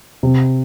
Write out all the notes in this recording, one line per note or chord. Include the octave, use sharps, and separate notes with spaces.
C3